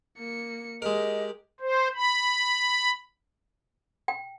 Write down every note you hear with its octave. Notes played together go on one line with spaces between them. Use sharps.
A#3 C#7
G#3 G4 A#4 D#5
C5
B5
G5